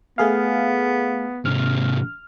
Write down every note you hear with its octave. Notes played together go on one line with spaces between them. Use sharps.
A3 B3 G#4 F5
G#2 C3 F6